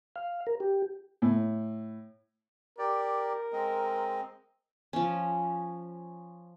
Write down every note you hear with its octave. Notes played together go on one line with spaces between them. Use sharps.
F5
A#4
G4
A2
G4 A#4 D5
G#3 C4 D#5
F3 C#4